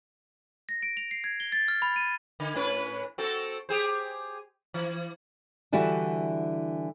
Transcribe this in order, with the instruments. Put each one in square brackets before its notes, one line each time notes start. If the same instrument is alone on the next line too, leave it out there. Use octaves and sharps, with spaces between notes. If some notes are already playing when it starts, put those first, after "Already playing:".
[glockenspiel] A#6
D7
F7
C7
G#6
G7
A6
F6
B5
D#7
[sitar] D3
A2 C#4 B4
C4 F#4 A4
G4 G#4 C5
E3
[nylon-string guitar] D3 E3 G3 E4 F#4